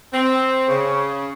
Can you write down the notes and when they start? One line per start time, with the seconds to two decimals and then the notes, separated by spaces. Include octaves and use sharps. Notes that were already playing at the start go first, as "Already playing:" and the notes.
0.12 C4
0.68 C#3